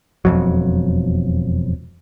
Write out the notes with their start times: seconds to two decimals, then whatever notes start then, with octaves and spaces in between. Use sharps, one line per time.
0.25 E1 F2 F#3